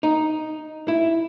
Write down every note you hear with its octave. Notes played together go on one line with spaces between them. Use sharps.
D#4
E4